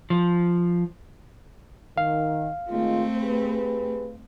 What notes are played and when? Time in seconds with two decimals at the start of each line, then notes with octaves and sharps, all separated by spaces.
0.10 F3
1.98 D#3 F5
2.69 D#3 G#3 A3 C4 F4
3.18 G4 G#4 B4